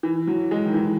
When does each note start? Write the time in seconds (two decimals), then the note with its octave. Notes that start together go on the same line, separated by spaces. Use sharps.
0.03 E3
0.27 F#3
0.51 G#3
0.65 D#3
0.74 E3